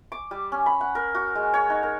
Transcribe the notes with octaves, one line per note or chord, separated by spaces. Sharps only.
D6
G3
C#4
B5
F#5
A#4
F#4
G#3
C#5
D#4
A#4